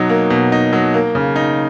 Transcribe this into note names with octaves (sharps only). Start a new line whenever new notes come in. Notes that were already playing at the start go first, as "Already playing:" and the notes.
Already playing: B2 F#3 D#4
A#3
B2
D#4
F#3
A#3
C#3
D#4